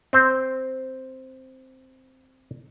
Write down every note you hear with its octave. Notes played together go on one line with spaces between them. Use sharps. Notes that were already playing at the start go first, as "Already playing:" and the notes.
C4 C5